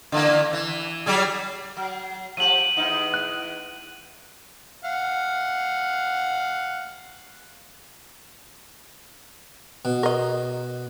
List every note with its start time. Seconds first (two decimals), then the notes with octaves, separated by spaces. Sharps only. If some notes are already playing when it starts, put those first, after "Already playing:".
0.12 D3 E3 A#3
0.53 E3
1.06 F#3 G3 G#4
1.77 F#3
2.37 F3 G4 D#7 F#7
2.77 E2 D#4
3.14 F#6
4.85 F5 F#5
9.85 B2
10.03 A#4 D#5